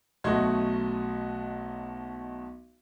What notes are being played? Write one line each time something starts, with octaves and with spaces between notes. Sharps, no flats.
B1 A3 F#4 D#5 C6 G#6